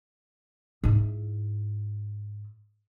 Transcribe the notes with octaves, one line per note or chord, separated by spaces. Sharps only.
G#2 E4